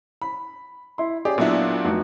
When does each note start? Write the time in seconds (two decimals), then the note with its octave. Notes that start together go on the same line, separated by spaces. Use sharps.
0.22 B5
0.98 E4 C6
1.25 C#4 G4 G#4 D5
1.38 A#2 F#3 B3 D4 E4
1.85 F1 D#4 F#4